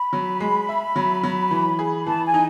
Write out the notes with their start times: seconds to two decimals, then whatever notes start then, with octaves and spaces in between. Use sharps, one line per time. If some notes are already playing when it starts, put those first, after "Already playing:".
Already playing: B5
0.13 F#3
0.40 G#3
0.69 E5
0.96 F#3
1.23 F#3
1.51 E3
1.79 G#4
2.06 E3 A5
2.25 G#5
2.34 D#4